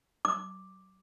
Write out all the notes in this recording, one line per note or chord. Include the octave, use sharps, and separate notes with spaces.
D6